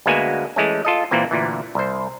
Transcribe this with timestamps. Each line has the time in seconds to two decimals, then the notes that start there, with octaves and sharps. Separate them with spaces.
0.06 D2 G#3 A#3 B3 F#4 G#5
0.56 E3 G#3 A3 C#4
0.85 F4 A4 D#5
1.11 A#2 E3 A#3 C4
1.31 D2 A#2 E3
1.75 C2 C5